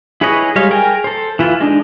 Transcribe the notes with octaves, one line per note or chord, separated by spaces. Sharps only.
E4 G#4 B4 C#5 D#5
G3 G#3 C#5 F5
G#4 A#4 G5 G#5 A#5
A4 C5
E3 E4 F4
G#3 D4 D#4